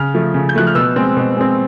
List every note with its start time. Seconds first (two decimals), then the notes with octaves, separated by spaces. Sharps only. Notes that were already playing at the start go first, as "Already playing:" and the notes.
Already playing: C#3 F6
0.14 F3 A3
0.34 C#3
0.49 G6
0.55 F3 A3 F#6
0.67 F6
0.75 B2 E6
0.96 G#3 C4
1.16 B2
1.37 G#3 C4